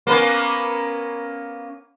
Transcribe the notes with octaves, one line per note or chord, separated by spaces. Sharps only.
A#3 B3 C#4